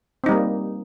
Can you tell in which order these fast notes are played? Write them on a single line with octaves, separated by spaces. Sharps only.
C4 D#4 G3 A#3